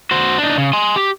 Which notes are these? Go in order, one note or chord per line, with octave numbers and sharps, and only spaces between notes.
F#4 C5
D4 D#4
C#3
G#5 C6
G4